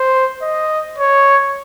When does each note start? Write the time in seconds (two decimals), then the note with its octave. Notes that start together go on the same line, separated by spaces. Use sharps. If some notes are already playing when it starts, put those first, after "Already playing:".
Already playing: C5
0.42 D#5
0.98 C#5